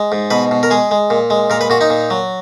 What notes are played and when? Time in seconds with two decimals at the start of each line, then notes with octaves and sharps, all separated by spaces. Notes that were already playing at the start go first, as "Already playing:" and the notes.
Already playing: G#3
0.12 G#2
0.30 B2 B4
0.51 B2
0.63 A#4
0.71 G#3 G#4
0.91 G#3
1.10 A#2
1.30 G#3
1.50 A#2 A#4
1.61 B4
1.70 A#2 F#4
1.81 D#4
1.90 A#2
2.10 F#3